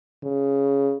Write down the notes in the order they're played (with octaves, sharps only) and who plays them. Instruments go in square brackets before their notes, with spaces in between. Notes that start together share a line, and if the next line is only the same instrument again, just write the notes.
[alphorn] C#3